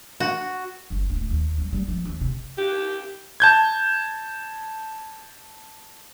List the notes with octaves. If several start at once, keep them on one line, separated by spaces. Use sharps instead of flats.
F#4
G1
D1
D#2
G3
G3
F3
D#2
C3
G4
A5 G6 G#6